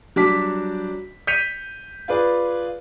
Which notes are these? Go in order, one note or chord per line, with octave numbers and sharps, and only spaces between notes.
F#3 G3 D4 A5 D6 B6
G6 B6 C#7 D#7 F7
F4 G#4 B4 D5